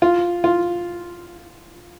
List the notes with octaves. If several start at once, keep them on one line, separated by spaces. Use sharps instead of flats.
F4
F4